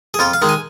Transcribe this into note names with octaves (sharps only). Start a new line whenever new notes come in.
G#4
F2 F4
F5
D#3 G#3
G#5